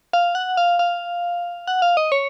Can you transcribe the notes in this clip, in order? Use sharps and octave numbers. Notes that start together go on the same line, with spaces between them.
F5
F#5
F5
F5
F#5
F5
D#5
C#5